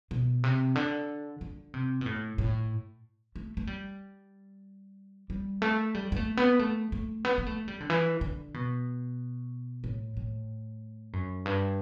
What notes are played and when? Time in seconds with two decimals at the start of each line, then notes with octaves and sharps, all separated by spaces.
0.11 B2
0.44 C3
0.75 D3
1.41 D3
1.74 C3
2.01 B2
2.06 A2
2.38 A2
3.36 A3
3.57 A3
3.67 G3
5.30 G3
5.62 A3
5.94 G3
6.12 B3
6.16 A3
6.37 B3
6.59 A3
6.92 A3
7.25 B3
7.38 B3
7.46 A3
7.68 G3
7.80 D3
7.90 E3
8.21 D3
8.54 B2
9.84 A2
10.17 A2
11.13 F#2
11.46 G2